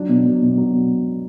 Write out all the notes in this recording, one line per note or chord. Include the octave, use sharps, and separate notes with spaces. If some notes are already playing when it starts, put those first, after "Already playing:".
Already playing: F#3 D4
B2
F#3
B2
F#3
B2